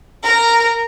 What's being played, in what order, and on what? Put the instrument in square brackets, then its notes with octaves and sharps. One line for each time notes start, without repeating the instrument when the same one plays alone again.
[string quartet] A#4